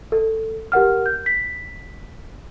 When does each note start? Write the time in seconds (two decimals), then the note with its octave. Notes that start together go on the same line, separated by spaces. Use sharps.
0.12 A4
0.72 G4 A#4 F#5 F6
1.06 G6
1.26 B6